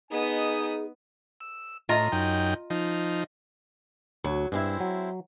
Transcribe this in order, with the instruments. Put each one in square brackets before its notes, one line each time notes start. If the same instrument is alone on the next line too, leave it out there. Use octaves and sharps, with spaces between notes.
[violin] B3 D#6 [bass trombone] D#4 [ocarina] G#4 [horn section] D#5 G#5
[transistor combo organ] E6
[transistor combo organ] A2 [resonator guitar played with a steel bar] F4 D#5 A#5
[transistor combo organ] F#2 D#4 G5
F3 D#4
[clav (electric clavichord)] D2 [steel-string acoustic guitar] F#3
[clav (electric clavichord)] G2 [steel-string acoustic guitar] G#3 C4 E4
[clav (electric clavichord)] F#3